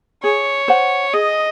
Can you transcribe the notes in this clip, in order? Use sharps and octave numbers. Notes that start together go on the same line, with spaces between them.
G#4 C#5
C5 F#5
G#4 D#5